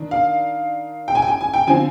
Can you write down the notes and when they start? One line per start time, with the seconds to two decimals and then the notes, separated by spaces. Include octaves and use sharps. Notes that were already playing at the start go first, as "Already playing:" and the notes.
Already playing: D#3 D4
0.11 F5
1.08 G5
1.15 G#5
1.22 G5
1.28 G#5
1.41 G#5
1.54 G5
1.67 D3 F3 C4 G#5